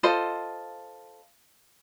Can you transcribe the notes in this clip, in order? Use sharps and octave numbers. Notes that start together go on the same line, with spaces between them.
F4 A4 C5 D#5